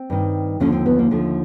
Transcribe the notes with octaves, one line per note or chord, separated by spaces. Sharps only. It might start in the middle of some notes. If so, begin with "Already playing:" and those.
Already playing: C4
G2 D#3
D#2 D3 F3 C#4
C4
B3
A#3
D#2 D3 F3 A3